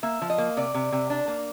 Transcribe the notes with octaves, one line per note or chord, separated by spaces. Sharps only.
A#3 E5
F3
D#5
A#3
C3 D5
C3
C3
D4
A#3